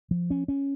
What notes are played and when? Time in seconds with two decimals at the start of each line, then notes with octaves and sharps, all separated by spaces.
0.11 F3
0.30 C#4
0.48 C#4